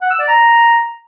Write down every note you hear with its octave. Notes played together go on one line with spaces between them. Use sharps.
F#5
E6
D5
A#5